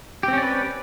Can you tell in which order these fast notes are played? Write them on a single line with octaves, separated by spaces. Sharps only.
G4 C4 C#4 D5 B4